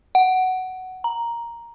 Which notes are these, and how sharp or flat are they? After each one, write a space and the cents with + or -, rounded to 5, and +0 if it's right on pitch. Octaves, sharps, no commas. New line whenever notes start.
F#5 +10
A#5 +5